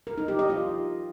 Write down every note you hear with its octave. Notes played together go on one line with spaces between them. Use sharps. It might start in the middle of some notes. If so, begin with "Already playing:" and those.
A#4
D#4
G4
D#5
F4